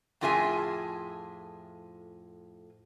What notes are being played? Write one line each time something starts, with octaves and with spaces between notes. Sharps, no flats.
F2 A2 F4 G#4 E5 G#5